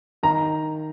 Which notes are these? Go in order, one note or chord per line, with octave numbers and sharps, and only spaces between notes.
D#3 A#5